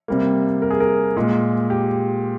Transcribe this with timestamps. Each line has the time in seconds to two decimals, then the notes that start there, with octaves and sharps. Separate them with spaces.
0.08 C3 G3 A#3
0.62 A#4
0.71 G#4
0.80 A#4
1.16 A#2 G#3
1.70 G4